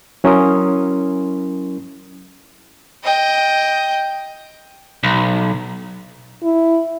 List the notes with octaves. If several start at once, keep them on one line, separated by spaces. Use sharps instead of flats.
F#3 C#4 E4 A#4 C6 D#6
D#5 G5
B1
E4